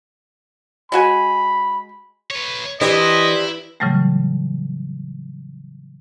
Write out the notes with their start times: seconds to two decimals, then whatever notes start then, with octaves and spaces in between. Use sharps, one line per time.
0.92 G#3 F#4 G#5 B5
2.31 B4 C#5
2.81 E3 C4 D4 E4 G4 D#5
3.80 A2 C#3 E3 F#3 G3 A3